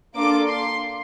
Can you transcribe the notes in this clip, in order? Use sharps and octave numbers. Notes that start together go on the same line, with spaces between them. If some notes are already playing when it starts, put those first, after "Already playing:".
A#3 D4 F4 A4 D6
C6